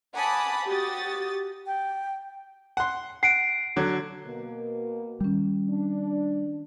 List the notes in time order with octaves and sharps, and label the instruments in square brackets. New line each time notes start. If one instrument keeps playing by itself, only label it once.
[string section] F#5 G#5 A5 B5 D6 D#6
F#4 G4 D#6 A6
[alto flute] G5
[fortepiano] F#5 C6
[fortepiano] F#5 [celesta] C7 D7
[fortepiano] D3 F#3
[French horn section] B2 A#3
[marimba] D#3 C#4 [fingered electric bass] G3
[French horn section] D4